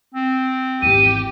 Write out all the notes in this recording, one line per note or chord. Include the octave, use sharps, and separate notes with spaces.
C4
G#1 E2 G4 D#7